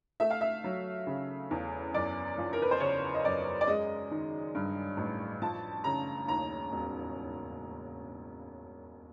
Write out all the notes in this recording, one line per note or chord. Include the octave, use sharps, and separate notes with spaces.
A3 E5
F5
E5
F#3
C#3
E2
F#2 D5
F3
A#4
B4
C5
C#3 C#5
D#5
F#2 D5
D5
G#3 D#5
D#3
G2
A1
F3 A5
C#3 A#5
D#2 A#5
E1